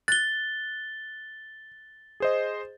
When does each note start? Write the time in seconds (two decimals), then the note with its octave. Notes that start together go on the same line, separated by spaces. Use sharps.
0.08 F#6 A6 G7
2.20 G#4 C5 D#5